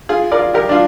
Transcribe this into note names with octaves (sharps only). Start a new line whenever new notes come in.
F4 G#4
A#4 D5
F4
G4 A#4
D4 F4